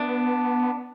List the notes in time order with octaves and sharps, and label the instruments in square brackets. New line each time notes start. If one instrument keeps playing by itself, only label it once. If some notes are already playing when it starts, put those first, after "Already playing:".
Already playing: [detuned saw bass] B3 [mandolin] D4